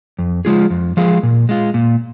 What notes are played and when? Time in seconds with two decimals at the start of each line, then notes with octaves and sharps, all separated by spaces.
0.19 F2
0.45 F3 G#3 F4 G#4
0.71 F2
0.97 F3 G#3 F4 G#4
1.23 A#2
1.49 G#3 F4
1.74 A#2